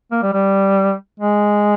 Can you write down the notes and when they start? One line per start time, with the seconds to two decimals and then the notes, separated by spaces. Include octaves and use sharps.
0.12 A#3
0.23 G3
0.33 G3
1.20 G#3